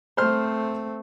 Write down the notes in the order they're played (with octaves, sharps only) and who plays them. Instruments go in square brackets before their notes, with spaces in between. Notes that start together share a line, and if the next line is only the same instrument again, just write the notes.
[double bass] A3 C4 [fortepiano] C5 C6 F6